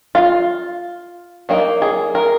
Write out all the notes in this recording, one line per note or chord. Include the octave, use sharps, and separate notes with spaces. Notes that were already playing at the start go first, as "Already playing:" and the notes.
F4
F#3 A#3 D#4
G#4
A#4